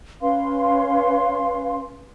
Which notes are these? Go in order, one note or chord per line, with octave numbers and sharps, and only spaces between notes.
C#4 B4 F5 C6